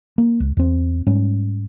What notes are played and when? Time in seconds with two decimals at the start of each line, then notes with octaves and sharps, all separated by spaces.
0.18 A#3
0.40 C#2
0.57 E2 C4
1.07 G#2 G3 C#4